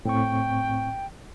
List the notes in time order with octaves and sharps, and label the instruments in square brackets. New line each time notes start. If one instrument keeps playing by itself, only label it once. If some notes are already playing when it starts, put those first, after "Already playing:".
[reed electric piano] A2 C4 C#6 [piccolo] G5